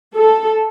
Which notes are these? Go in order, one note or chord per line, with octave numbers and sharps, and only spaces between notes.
A4